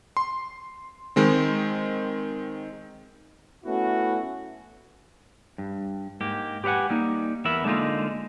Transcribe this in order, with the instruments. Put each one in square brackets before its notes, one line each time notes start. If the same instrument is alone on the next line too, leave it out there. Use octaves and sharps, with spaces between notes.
[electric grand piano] C6
D#3 G#3 C4
[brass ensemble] A3 B3 C#4 E4 F#4
[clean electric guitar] G2
G#2 A#3 G4
G4 B4 C#5 F#5 G#5
G3 A#3 D#4
E2 E3 B3 A#4 E5 B5
D3 G#3 A#3 D#4 F4